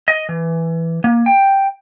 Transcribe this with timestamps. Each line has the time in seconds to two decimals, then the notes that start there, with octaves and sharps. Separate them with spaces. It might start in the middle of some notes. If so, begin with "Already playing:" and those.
0.08 D#5
0.29 E3
1.04 A#3
1.26 G5